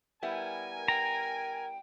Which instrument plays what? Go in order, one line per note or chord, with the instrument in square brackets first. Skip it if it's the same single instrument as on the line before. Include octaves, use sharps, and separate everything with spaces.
[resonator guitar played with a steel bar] G3 B3 E4 [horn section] A#4 G#5
[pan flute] G5 [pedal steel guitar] A#5